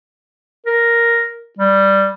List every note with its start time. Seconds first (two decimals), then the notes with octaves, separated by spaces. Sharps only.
0.67 A#4
1.59 G3